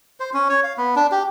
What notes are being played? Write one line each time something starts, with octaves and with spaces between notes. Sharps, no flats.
C5
C#4
C#5
F5
B3
D4
G4